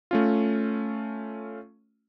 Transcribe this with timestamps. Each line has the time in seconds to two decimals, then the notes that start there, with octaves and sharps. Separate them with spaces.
0.11 A3 C#4 F4